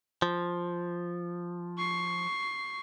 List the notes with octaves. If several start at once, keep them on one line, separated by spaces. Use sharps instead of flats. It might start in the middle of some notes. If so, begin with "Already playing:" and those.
F3
C#6 C7